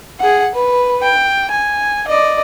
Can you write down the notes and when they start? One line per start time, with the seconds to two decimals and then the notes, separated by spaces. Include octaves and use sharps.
0.20 G#4 F#5
0.55 B4
1.02 G5
1.51 G#5
2.08 D5 D#5